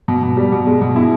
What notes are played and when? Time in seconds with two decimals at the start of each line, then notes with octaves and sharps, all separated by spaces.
0.08 B2
0.23 B2
0.37 G3
0.52 B2
0.67 G#3
0.81 B2
0.96 E4